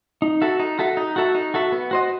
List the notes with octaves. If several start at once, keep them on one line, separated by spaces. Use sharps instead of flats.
D#4
F#4 A4 E5
D#4
F#4 A4 E5
D#4
F#4 A4 E5
D#4
F#4 A4 E5
B3
F#4 C5 D#5